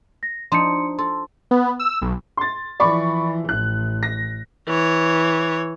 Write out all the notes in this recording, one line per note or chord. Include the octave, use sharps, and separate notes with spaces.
A#6
F3 D4 D#4 C6 C#7
A4 C6
B3
E6
B1
C6 A6
E3 F3 D5 B5 C#6
A1 F#6
A#6
E3 C#5